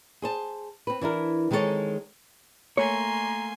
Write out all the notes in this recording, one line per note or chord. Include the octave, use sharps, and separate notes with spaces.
G#4 C5 A5
C4 B4
E3 D4 E4 A#4
D#3 G#3 C4 C#4 A4 C#5
A3 A#3 C#5 G#5 A#5 C6